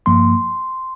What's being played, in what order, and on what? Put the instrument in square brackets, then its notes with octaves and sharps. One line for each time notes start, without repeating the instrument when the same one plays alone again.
[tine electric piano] G2 F3 A#3 C6